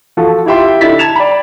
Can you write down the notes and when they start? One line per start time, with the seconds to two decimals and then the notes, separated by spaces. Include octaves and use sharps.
0.17 F3 F#4 A4
0.46 E4 F4 G4 E5 G5 C6
0.81 D3 D#4 E4 A6 B6
0.99 A5 G#6 E7 F7
1.16 D5 G5 B5